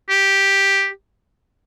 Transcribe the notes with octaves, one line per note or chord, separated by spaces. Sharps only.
G4